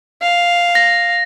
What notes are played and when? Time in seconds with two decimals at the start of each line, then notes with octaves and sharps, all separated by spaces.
0.22 F5
0.75 A#6